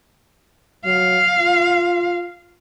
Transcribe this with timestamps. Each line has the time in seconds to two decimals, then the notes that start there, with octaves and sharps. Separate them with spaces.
0.85 F#3 F5
1.40 F4